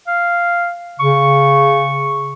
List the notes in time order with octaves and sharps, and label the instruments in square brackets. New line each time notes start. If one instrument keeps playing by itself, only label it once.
[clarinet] F5
[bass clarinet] C#3 [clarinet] C#6